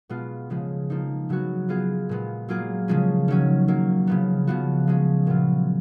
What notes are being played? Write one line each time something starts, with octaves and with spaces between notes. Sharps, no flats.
B2 G#3 B3 F4
C#3 F3 G#3
F3 A#3 D#4
C#3 F#3 B3 F#4
G#3 B3 F4 G#4
A#2 G#3 B3
F#3 A#3 F4 G#4
C#3 F3 G#3 C#4
D#3 F#3 C#4
D#3 F#3 A#3
C#3 F3 B3
C#3 F3 B3 F#4
F3 G#3 C#4
A#2 F#3 B3 F4